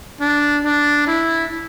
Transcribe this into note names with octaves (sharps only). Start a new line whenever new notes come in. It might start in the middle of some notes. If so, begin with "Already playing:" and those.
D4
D4
E4